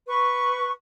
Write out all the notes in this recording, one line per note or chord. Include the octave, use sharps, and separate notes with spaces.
B4 C#6